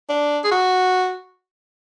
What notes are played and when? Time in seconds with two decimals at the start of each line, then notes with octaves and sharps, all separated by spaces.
0.09 D4
0.44 G#4
0.52 F#4